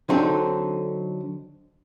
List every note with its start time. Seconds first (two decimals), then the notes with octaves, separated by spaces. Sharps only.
0.09 D3 F#3 C4 D#4 A4